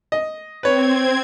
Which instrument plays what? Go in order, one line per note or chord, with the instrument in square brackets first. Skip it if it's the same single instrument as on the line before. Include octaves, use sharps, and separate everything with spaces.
[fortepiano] D#5
[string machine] C4 G#6 [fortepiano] B4 C#5